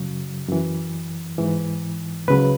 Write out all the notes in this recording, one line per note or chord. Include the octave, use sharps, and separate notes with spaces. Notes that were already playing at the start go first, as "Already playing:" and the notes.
Already playing: F#2 C#3 F#3
F#2 E3
G#2 E3
C#2 C#3 F#3 B4